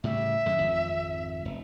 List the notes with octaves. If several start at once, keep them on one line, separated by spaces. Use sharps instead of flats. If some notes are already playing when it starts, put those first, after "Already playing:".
A2 C#3 G3 E5
F#2 D3 G#3
G#1 F2
F1